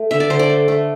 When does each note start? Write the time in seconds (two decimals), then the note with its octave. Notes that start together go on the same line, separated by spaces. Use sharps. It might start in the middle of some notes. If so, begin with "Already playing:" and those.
Already playing: A3
0.11 D3 E5
0.20 D5
0.30 D3 C5
0.39 D5
0.50 A3
0.68 A3